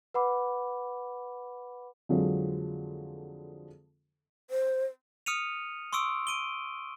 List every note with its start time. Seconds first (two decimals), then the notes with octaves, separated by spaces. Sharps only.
0.14 B4 F#5 B5 D6
2.09 F2 D3 F3 F#3 G#3
4.50 C5
5.26 D#6 F6 C#7 D#7 F7
5.93 C6 C#6 D#6 E6 D7
6.27 D7 D#7 G7